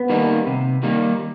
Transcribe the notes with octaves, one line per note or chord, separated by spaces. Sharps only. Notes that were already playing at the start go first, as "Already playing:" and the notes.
Already playing: B3
D#3 G3 A#3 D#4
C3
D#3 G3 A#3 D#4